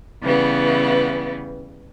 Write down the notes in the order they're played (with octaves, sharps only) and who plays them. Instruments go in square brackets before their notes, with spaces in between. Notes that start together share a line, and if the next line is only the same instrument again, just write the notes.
[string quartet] C#3 E3 G3 B3